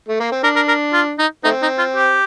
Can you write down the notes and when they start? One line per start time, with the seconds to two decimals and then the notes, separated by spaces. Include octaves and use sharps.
0.09 A3
0.20 A#3
0.32 C4
0.43 D4 A#4
0.56 A#4
0.68 A#4
0.93 F4
1.19 D#4
1.44 A3 C4 D#4
1.62 D#4
1.78 F4
1.95 G4